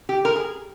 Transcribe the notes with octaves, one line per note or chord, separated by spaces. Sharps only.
G4
A#4
G#4